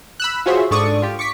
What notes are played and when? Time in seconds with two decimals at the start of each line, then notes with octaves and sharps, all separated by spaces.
0.20 B5 E6 F#6
0.46 F4 F#4 G#4 C5 C#5 E5
0.71 G#2 D4 A4 D5 C#6 D#6
1.02 F4 G4
1.19 C#6 D6 B6 C#7